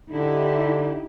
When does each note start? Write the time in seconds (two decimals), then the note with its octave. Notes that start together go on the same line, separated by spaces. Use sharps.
0.12 D3 D#4 E4 G4